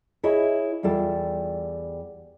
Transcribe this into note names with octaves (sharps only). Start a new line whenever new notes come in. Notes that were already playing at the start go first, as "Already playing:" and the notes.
E4 G#4 C#5 D#5 E5
E2 G3 F4 A4